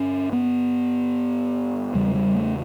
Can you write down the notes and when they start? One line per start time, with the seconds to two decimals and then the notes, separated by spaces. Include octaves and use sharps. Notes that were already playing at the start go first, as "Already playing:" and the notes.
Already playing: G2 D3 C#4
0.33 B3
1.94 E2 C#3 G3
2.15 G3
2.35 A3